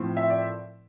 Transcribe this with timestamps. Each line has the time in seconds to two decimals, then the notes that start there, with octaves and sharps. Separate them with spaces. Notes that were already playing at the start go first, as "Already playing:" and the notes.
Already playing: A2 F3 C4
0.17 E5
0.30 D5